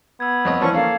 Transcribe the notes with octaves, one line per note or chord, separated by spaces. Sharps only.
B3 E6 G#6
F2 C#5 D#5
E3 F3 C#4 C#5 D5 C#6
A#3 C#4 A4 F5